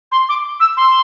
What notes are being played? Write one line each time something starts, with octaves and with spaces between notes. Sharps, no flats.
C6
D6
E6
C6